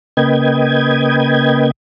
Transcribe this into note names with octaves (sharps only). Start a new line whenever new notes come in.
C#3 A#3 B4 D#5 G5 G#6